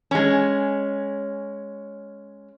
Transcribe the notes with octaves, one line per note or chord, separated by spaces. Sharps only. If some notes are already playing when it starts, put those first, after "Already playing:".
G#3 C#4